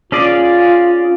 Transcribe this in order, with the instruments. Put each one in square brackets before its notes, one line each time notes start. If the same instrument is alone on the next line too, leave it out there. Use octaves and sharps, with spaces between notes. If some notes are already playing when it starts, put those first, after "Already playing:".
[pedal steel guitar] C#4 G#4 D5 [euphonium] F4